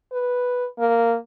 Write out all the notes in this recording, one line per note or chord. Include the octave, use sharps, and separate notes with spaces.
B4
A#3